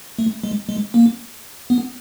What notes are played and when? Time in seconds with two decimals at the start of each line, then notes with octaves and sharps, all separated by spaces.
0.19 A3
0.43 G#3
0.69 G#3
0.94 A#3
1.70 B3